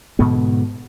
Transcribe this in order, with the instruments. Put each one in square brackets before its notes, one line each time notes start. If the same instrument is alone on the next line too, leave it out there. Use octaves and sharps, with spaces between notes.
[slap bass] G#2 B2 D3 B3